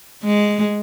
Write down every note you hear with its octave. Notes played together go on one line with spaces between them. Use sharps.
G#3